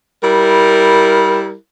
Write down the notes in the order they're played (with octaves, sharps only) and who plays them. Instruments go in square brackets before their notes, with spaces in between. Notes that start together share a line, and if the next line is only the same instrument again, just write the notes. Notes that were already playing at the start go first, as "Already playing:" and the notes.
[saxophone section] G3 E4 A#4